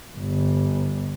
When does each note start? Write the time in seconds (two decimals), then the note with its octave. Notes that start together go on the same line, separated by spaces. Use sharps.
0.17 G1